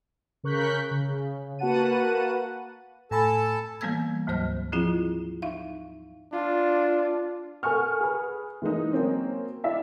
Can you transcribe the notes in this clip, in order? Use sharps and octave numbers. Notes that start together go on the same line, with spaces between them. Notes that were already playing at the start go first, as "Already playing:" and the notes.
C#3 A#4 C#6 F#6 G6 B6
C#3
A#3 F#4 B4 F#5 A5 D#7
A2 A4 G#5 A5 B5
E3 G3 A#3 B3 E6 G#6
D2 G#2 F#3 C5 F6
F3 C4 E4 F4 G#4
D#4 E5 F5
D4 F4
A4 A#4 F#5 G#5 C#6 F6
G#4 B4
E3 G#3 A#3 D#4
F#3 A#3 C4 C#4
E4 D5 E5 F5